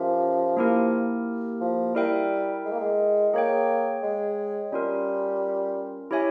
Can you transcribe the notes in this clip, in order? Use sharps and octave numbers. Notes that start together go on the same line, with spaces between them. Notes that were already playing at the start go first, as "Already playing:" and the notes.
Already playing: F3 C#4 G4 A#4 E5
A#3 E4 G4 A#4
F3
G3 E4 A#4 E5 G5
G#3
A#3
G#3
A#3 G#4 C#5 G5
G#3
G3 C#4 F4 A#4
E4 G4 C#5 E5 G#5